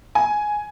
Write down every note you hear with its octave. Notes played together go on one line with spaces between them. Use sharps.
G#5